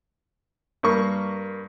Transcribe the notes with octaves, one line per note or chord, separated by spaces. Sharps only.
G2 A#3 C#6